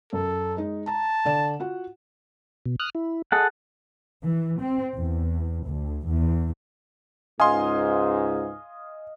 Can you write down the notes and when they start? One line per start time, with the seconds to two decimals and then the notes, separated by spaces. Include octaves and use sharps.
0.13 F#2 A4
0.57 G#3 D#4
0.87 A5 A#5
1.25 D3 D5 E7
1.60 F4 F#4 F#5
2.66 B2
2.80 D#6 F6 F#6
2.95 E4
3.32 G#4 A4 D#5 F#5
4.22 E3
4.61 C4
4.96 E2
5.65 D2
6.06 E2
7.40 C#2 G#2 D#5 F5 G#5 C6